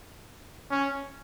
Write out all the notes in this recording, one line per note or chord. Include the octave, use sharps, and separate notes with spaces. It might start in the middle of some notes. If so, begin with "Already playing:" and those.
C#4